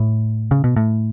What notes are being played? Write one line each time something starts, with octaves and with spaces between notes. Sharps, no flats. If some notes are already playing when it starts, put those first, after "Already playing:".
Already playing: A2
C#3
B2
A2